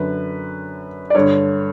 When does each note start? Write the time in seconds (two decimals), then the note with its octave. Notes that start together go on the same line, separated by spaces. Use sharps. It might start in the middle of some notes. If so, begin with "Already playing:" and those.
Already playing: F#2 D3 B4
1.10 D5
1.15 G2 D3 C#5